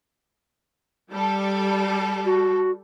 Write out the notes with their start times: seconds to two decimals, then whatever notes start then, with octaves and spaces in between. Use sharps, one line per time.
1.11 G3 A4
2.25 F#4